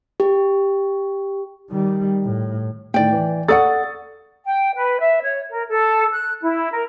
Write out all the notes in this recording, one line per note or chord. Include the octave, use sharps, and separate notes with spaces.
G4
D#3 G3
A2
A2 D#3 D5 G5
E3
A4 D5 F#5 C#6 D#6 A6
G5
B4
E5
C#5
A#4
A4
F#6
E4
A#4